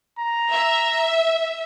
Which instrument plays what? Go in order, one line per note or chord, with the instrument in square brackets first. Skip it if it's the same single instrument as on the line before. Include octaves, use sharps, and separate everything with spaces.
[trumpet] A#5
[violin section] E5